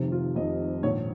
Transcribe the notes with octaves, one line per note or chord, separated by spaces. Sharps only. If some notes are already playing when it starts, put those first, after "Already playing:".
Already playing: F1 F2 C3 D#3
F4
F1 F2 C3 D#3 D#5
A#1 G#2 D#3 C#5